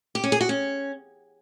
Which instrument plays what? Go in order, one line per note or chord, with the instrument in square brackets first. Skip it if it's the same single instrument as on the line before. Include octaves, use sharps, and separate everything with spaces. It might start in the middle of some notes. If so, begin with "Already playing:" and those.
[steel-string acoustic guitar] G4
C#4
G#4
F#4
C#4